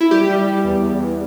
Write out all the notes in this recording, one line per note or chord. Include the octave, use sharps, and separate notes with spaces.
E4
G3 G4
G3
G3
E2
E2
E2